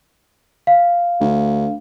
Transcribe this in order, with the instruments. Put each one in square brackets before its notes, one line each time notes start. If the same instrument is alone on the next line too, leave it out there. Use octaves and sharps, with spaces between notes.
[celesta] F5
[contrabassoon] D2